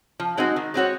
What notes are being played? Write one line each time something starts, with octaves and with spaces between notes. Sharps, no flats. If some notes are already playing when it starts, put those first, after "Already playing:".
F3
G#3 C4 D#4 F#4
D#3
G#3 C4 F#4 C#5